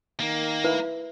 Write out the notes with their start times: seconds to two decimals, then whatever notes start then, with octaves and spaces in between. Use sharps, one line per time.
0.20 D#3 A#3
0.64 E4 B4